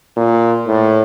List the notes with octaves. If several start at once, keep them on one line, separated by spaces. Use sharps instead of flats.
A#2
A2